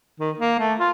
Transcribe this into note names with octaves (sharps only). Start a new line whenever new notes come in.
D#3
A#3
A3
F4